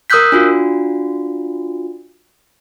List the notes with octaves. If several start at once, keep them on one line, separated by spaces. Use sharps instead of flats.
A#4 D#6 E6 F#6 G6 B6
D4 F4 F#4